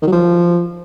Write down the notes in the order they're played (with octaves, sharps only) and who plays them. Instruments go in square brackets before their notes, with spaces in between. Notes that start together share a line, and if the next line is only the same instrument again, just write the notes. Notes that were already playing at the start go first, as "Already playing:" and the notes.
[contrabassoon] D#3
F#3
F3